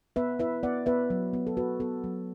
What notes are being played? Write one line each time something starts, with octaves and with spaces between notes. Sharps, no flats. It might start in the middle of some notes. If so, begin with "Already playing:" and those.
B3 B4 E5
E4 B4 E5
B3 D5 F#5
B3 B4 E5
F#3
B3
A4
B3 F#4 B4
B3 A4
F#3